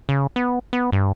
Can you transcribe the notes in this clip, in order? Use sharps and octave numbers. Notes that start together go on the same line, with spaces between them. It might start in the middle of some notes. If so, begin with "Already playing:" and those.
C#3
B3
B3
G2